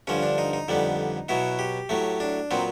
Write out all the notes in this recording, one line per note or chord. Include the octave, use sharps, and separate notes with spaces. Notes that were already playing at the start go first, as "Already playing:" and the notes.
G2 D3 F3 C#4
D4
D#4
D#4
F2 D3 G3 B3
B2 F#3 B3 E4
G4
A2 F#3 A3
D4
A#2 F#3 B3 C4